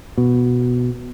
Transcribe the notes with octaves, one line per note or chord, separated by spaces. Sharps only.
B2